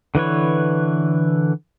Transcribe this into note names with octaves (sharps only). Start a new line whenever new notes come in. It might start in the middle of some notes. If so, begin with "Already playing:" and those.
D3 E3 B4 C#5